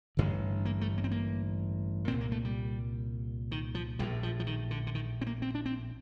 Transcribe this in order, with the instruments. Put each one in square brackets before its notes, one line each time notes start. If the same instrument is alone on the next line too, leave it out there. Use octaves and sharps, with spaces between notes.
[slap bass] A1 G2 D3
A#3
A3
A#3
C4
A#3
A#2 C4
C2
A#3
A3
G3
D#3
F3
A#1 A2 G3
F3
F3
D#3
D3
D3
D#3
C4
A#3
C4
D4
C4